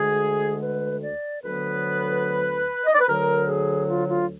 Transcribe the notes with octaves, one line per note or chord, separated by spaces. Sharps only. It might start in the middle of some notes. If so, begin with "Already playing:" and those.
Already playing: D2 D3 G#3 G#4
B4
D5
D2 D3 F#3 B3 B4
D#5
D5
B4
D2 D3 F#3 A#4
G#4
F4
F4